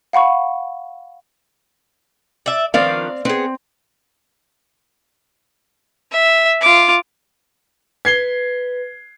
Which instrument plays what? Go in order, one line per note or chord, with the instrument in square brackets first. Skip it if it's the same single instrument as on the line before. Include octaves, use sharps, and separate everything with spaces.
[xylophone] F5 F#5 B5 C#6
[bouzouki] D5 E5
[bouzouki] D#3 F3 D4 [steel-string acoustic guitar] C4 D5 F5
[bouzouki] B3 G#4 [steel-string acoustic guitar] C4
[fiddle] E5
F4 D6
[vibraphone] B4 [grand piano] G#6 C7 G7